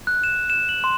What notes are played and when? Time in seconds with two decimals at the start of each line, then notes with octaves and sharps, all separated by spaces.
0.07 F#6
0.24 E7
0.50 E7
0.69 F#7
0.84 C6